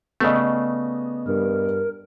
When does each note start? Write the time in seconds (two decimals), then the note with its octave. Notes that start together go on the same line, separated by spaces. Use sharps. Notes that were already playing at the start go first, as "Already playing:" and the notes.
0.20 C#3 A3 B3 D5 D#5
1.27 G2 A#4